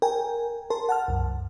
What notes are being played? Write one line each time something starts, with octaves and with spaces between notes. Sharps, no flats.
A#4 G5 G#5
A#4 A5 C6
F#5 A5 F6
C2 F#2